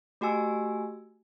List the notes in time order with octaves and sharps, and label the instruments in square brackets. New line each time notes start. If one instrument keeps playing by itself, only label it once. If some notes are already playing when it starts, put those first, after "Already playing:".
[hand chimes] A3 F#4 G4 G#5 E6